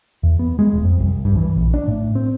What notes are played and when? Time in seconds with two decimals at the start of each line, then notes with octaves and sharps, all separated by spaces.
0.23 E2
0.39 B3
0.59 G#3
0.73 D#1
0.85 F2
1.00 C2
1.25 G2
1.37 E3
1.56 A#1
1.74 D4
1.88 A2
2.15 C4